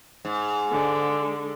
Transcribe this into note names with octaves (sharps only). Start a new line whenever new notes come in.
G#2
D3 G#3